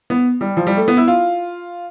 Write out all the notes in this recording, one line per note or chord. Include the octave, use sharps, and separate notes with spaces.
B3
G3
F3
G3
A3
B3
E4
F4